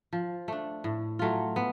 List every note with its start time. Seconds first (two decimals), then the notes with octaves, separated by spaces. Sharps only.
0.13 F3
0.48 A3 D4
0.84 A2
1.19 F#3 A3 F4
1.56 B3